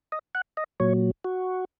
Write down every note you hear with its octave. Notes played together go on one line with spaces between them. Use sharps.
D#5
F#5
D#5
A#2 F#3 C#5
F#4